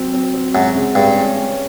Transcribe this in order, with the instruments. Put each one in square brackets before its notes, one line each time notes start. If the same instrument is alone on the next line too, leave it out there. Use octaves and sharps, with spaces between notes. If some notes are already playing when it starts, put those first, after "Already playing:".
Already playing: [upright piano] F#3 C4
C4
C4
[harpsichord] F#2 [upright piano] G#3
[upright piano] C#3
[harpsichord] G2 [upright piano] G#3
[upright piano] C#4
C#4